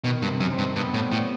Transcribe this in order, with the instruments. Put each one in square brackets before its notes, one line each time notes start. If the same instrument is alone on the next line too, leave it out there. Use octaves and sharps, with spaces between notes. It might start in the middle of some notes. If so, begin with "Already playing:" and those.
[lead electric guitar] B2 [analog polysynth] D#3
[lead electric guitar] G2
[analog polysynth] C3
[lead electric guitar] F#2
[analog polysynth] C4
[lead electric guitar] G2
[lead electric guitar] G2 [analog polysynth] B3
[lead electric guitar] A2
[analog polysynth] G3
[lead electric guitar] A2